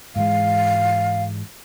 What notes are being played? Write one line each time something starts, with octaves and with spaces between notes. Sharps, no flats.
G#2 E3 G#3 F5